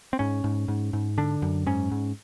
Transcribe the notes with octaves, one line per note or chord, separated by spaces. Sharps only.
C4
G#2 C#4
G#2
G#2
G#2
D3 D4
F#2
G#2 C#4
G#2